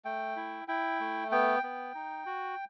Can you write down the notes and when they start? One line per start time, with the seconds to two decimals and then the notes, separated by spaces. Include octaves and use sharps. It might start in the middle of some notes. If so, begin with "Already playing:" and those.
0.05 A3 G5
0.36 E4
0.68 E4 G5
1.00 A3
1.31 B3 G5
1.63 B3
1.95 D#4
2.26 F#4